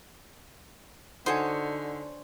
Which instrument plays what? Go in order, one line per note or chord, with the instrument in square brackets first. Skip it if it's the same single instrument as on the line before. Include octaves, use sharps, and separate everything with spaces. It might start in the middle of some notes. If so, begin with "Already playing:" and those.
[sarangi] D3 [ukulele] D#4 F#4 A4 [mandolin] C5 C#5 G#5